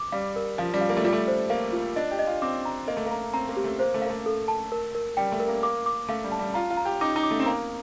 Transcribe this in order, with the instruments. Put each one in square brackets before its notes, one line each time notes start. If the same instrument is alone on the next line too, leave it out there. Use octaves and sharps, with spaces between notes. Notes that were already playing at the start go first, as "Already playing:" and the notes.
Already playing: [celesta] D6
[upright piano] G3 [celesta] F5
[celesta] A#4
[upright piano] F3 [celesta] F5
[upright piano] G3
[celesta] F5
[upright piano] A#3
A3
[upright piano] G3 [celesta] F4
[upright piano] A3
[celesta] C5
[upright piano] A#3 [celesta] F5
[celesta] F4
[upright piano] D4 [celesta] D#5
[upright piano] G4
[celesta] D#5
[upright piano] F4
[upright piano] C4 [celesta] D6
[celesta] A#5
[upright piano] A#3 [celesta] D#5
[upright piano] A3
[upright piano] A#3 [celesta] A#5
[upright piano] C4 [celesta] A#5
[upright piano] A#3
[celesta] G4
[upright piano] A3
[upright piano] A#3 [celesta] C5
[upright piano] A3
[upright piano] A#3 [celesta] F5
[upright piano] A3
[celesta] A4
A5
A#4
A#4
[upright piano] G3 [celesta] G5
[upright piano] A3
[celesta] A#4
[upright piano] A#3
[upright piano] A#3 [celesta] D6
[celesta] D6
[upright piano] A3 [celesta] F5
[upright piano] G3
[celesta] A5
[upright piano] G3
[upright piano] F4 [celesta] A#5
[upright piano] F4
[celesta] A#5
[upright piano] G4
[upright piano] D#4 [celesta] D6
[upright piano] D#4
[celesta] D6
[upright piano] A3
C4
[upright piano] A#3 [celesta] A#5